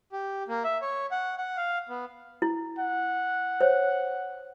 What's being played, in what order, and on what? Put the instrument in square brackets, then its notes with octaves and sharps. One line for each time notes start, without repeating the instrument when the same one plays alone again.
[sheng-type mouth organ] G4
A#3
E5
C#5
F#5
F#5
F5
B3
[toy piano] E4
[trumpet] F#5
[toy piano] C5 C#5